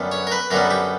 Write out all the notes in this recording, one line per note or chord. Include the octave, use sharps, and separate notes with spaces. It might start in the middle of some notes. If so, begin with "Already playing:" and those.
Already playing: F#2 D3 G3 B3
C#5
A#4
B4
F#2 D3 G3 B3 A#4
G4